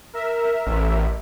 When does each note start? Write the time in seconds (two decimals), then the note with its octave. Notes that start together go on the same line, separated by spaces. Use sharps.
0.13 A#4 E5
0.67 A1